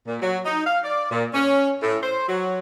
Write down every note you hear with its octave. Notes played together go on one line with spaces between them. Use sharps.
A#2
F#3
D#4
F5
D5
A#2
C#4
A2
C5
F#3